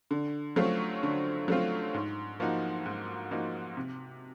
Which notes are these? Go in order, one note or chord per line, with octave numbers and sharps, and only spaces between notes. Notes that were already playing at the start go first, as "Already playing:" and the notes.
D3
F#3 A3 C4 F4
D3
F#3 A3 C4 F4
G#2
F3 A#3 D#4 F#4
G#2
F3 A#3 D#4 F#4
C3